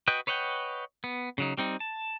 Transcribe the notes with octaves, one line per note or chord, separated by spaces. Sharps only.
F#4 B4 D#5 G5
B4 C#5 D#5 F#5 G5
B3
C#3 F#3 D#4
G3 C4 D#4
A5